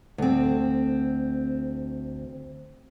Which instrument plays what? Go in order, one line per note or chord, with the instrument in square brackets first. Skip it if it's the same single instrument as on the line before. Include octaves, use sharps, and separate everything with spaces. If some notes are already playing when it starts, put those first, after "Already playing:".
[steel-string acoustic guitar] D2 C4